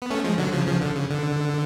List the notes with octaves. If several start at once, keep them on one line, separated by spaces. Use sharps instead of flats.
B3
A3 C#4
F3 G#3
D3 F#3
C#3 F3
C#3 F3
D3
C#3
D3